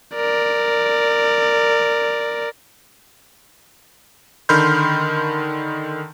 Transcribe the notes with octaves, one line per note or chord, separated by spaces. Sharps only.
A#4 D5
D3 D#3 B5 C6 F6 G6